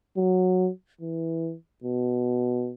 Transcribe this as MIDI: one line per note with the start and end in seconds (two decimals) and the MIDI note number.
0.17 0.70 54
1.01 1.55 52
1.84 2.73 47